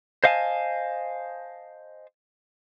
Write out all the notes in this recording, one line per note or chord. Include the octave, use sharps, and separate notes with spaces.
C5 D#5 F5 F#5 G#5 A5